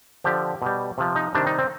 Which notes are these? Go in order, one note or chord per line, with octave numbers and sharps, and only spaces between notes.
D3 F3 G4
B2 G3
C3 F3
D#4
C3 D#3 G3 D4
D#4
C4